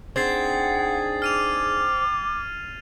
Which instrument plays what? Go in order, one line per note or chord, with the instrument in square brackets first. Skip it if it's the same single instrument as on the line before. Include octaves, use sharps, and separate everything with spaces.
[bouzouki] C4 [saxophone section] D4 D#4 G#4 [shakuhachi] F#5 [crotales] G#6 A6 C7
[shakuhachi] D6 [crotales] F6 D#7 F7